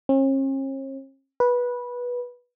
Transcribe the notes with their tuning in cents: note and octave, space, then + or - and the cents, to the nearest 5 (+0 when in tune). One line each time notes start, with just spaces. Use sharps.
C#4 -45
B4 -15